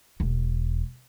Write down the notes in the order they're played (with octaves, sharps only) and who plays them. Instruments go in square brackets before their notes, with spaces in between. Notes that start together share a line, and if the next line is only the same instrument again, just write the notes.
[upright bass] E1